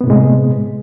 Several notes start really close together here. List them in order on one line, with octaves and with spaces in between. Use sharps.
B3 C3 A2 G#3